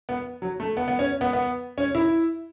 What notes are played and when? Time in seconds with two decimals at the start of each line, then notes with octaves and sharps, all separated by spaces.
0.09 B3
0.42 F#3
0.60 A3
0.77 B3
0.88 B3
0.99 C#4
1.21 B3
1.33 B3
1.78 C#4
1.95 E4